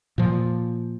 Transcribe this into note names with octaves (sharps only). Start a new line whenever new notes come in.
A#2 F3